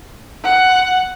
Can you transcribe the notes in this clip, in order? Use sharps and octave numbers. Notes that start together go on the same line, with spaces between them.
F#5